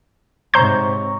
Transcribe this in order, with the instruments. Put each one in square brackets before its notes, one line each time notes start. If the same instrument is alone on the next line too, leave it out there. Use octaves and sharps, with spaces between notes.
[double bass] G#2 C3 [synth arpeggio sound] C5 G6 [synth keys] C#5 A#5 C#6